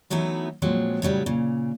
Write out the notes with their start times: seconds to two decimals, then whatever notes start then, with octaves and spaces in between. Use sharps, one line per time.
0.10 E3 F#3 A3 B3 D#4 E4
0.62 A#2 F3 F#3 G#3 C4
1.02 A2 C#3 F#3 G3
1.26 A#2 C#3